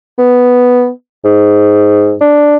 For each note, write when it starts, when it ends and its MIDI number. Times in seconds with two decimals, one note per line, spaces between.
0.18 0.89 59
1.25 2.15 44
2.21 2.57 62